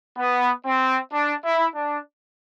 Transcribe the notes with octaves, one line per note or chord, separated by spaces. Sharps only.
B3
C4
D4
E4
D4